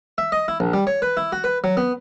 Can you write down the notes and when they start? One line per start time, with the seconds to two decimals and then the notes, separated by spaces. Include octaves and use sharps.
0.18 E5
0.32 D#5
0.48 E4
0.60 A#1
0.73 G3
0.87 C#5
1.02 B4
1.17 E4
1.32 F#4
1.44 B4
1.64 F#3
1.77 B3